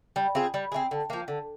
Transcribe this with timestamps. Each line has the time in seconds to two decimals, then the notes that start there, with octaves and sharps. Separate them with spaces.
0.16 G3
0.35 C4 F4 G#4
0.54 G3
0.72 C4 F4 G#4
0.91 D3
1.10 F3 A#3
1.28 D3